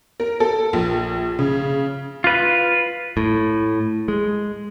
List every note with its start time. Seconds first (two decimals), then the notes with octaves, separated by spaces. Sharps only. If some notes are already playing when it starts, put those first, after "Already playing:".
0.20 A#4
0.40 A4
0.73 A#1
1.39 C#3
2.24 F4 B4
3.17 A2
4.08 G#3